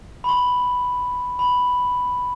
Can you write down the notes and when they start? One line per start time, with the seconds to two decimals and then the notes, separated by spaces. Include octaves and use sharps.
0.24 B5
0.29 C6
1.39 B5